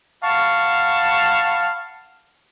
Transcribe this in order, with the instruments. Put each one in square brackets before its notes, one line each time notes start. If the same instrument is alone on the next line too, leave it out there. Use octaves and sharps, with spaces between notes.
[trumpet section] F5 F#5 A5 B5 C#6